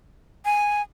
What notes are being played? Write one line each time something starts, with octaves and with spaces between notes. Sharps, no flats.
G#5